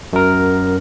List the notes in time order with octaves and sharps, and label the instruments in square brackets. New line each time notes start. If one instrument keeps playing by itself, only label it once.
[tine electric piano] F#2 A#4